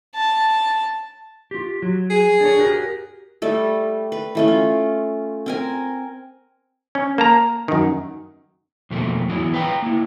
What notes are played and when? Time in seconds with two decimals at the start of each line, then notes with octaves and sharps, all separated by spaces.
0.15 A5
1.51 F4 G4
1.82 F#3
2.10 G#4
2.41 D4 A4 C#5
2.59 F#4 G4 A#4
3.42 G3 A3 A4
4.12 B4
4.35 E3 A3 C#4
4.48 F4
5.46 C4 A#4 G#5
6.95 C#4
7.18 A#3 A5 A#5
7.68 F#2 D#3
8.91 F2 B2 A3 A#3
9.29 E3 F#3 B3 E4
9.54 B4 F5 G5 A5 A#5
9.82 A#3 E4